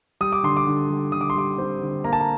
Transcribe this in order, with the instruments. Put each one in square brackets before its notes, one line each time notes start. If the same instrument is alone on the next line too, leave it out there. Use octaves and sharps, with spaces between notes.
[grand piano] G3 D#6
D6
D3 C6
D6
D3
G3
D3 D#6
D6
C6
G3 D6
C4
D3
A#3 A#5
A5
A#5